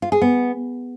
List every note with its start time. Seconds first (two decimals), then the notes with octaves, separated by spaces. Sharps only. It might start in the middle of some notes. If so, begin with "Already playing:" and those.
0.02 F4
0.12 G#4
0.22 B3